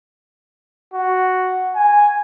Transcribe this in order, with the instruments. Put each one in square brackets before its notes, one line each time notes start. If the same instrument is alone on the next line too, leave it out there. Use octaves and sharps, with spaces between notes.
[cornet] F#4
G#5